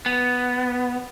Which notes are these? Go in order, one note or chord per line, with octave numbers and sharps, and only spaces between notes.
B3